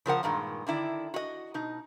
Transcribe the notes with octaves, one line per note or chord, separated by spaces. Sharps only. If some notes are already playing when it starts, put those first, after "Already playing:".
C#3 F3 A#4 F#5
G2 A#2 D#3 G#3
D3 D#3 E4 D5
F#4 D#5
B2 D#4